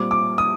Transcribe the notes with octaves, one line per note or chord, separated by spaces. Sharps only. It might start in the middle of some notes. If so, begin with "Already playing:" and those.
Already playing: A#2 G3 C4 D6
D6
D#6